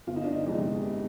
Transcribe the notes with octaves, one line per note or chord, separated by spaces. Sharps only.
G1 F4
D#4
D4
D#4
F2 C3 F3 G#3